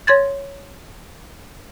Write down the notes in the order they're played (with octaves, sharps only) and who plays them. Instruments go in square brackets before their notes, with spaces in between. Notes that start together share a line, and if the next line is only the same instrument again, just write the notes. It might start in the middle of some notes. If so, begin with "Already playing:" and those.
[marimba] C#5 C6 G#6 A6